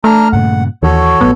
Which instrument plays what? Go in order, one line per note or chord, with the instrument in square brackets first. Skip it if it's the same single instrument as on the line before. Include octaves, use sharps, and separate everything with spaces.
[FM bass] A3 [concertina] D4 A#5 F6
[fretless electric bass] G2 A#2 C#3 [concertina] F#5
[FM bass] D#2 [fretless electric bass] E3 [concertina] F#4 A4 C#5
[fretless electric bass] G#1 A2 F#3 [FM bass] B3